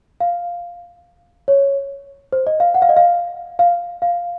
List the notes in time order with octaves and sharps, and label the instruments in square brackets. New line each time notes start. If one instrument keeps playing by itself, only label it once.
[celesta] F5
C#5
C5
D#5
F5
F#5
F5
D#5
F5
F5
F5